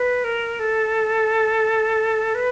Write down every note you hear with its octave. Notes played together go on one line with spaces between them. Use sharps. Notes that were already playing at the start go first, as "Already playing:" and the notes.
Already playing: B4
A#4
A4
B4